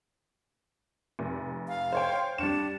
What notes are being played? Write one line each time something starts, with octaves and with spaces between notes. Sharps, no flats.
F1
F5
C5 C#5 G5
G3 D4 C#7 E7